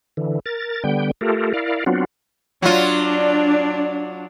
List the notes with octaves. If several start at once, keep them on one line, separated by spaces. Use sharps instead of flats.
D3 E3
A#4 A6
D3 G3 B3 G5
A3 F4 G4 A4 A#4
E4 A#4 D5 F5
F#3 B3 C4 D4 F4 F#4
F#3 D4 F4